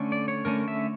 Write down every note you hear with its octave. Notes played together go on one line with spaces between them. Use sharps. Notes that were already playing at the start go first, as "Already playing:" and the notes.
Already playing: D3 A3 C#4
D5
C#5
D3 A3 C#4 A#4
E5